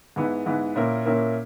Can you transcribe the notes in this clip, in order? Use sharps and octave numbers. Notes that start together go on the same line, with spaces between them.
G#2 E3 B3
G#2 E3 B3
A#2 A#3 C#4 E4 A#4
A#2 A#3 C#4 E4 A#4